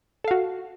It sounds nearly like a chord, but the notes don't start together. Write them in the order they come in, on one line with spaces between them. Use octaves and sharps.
A4 F5 F#4